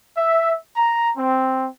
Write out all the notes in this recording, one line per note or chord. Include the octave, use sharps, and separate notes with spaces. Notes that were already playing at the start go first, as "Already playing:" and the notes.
E5
A#5
C4